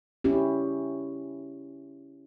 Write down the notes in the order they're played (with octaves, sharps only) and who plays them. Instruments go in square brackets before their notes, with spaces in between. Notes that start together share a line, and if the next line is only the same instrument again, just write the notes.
[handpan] C#4 E4 G4